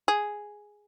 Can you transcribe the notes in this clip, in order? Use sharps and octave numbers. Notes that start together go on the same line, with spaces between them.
G#4